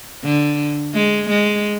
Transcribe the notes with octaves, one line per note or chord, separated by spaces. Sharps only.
D3
G#3
G#3